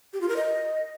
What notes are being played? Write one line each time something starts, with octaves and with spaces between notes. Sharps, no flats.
G4
F4
A#4
D#5